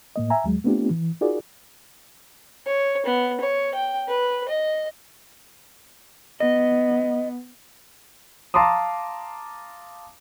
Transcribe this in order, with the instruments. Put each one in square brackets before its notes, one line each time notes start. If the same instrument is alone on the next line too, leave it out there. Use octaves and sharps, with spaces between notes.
[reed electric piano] A2 A#3 D#5
E5 G#5 A#5
D#2 F#3 G#3
A3 B3 C4 D4 F4 G4
E3
D#4 F4 F#4 G#4 A#4 D5
[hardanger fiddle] C#5
B3
C#5
G5
B4
D#5
[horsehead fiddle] B3 [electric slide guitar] D#5
[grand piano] F5 A5 A#5 C6 D6 D#6